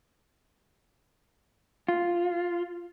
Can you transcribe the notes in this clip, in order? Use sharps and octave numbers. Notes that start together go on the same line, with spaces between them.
F4